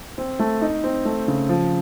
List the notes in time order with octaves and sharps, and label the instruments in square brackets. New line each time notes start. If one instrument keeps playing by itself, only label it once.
[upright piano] C4
A3
D#4
C4
A3
C#3
F3